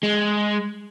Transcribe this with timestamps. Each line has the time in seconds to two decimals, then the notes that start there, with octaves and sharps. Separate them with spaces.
0.03 G#3